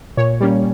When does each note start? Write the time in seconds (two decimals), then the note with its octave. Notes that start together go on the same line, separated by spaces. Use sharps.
0.17 A#2 C#5
0.40 G3 A#3 C#4